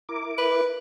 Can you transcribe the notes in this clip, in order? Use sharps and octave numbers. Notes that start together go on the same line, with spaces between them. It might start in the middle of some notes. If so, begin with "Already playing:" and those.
E4 A#4 D6
B4